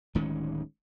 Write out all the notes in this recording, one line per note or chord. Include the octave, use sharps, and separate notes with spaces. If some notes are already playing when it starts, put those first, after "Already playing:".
D1 D#3 G#3 C#4